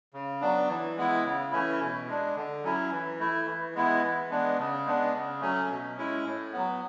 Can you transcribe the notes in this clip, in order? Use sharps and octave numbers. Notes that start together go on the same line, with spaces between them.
C#3
F#3 B3 D4
E3
G#3 B3 E4
C#3
E3 A3 C#4 E4
B2
G#3 D4
D3
F#3 C#4 E4
E3
A3 E4
E3
G#3 B3 E4
E3
G#3 B3 D4
C#3
G#3 B3 D4
C#3
F#3 A3 C#4
B2
G#3 C#4 E4
A2
F#3 B3